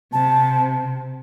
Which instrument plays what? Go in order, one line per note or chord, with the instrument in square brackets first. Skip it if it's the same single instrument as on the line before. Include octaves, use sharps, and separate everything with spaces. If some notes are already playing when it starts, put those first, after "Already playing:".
[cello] C3 [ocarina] A5